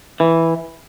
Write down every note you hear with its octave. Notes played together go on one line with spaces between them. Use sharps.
E3